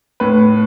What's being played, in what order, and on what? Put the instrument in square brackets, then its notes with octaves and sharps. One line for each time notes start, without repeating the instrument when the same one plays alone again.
[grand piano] A2 B4